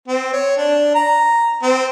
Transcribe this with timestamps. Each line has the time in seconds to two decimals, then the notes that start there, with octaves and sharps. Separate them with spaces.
0.08 C4
0.33 C#5
0.58 D4
0.95 A#5
1.62 C4